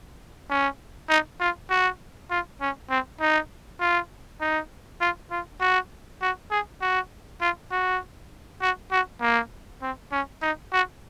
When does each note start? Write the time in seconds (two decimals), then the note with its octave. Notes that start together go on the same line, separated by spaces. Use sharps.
0.50 C#4
1.09 D#4
1.40 F4
1.70 F#4
2.30 F4
2.61 C#4
2.90 C4
3.20 D#4
3.80 F4
4.41 D#4
5.01 F4
5.31 F4
5.61 F#4
6.22 F#4
6.51 G#4
6.82 F#4
7.41 F4
7.71 F#4
8.62 F#4
8.92 F#4
9.21 A#3
9.82 C4
10.12 C#4
10.42 D#4
10.73 F#4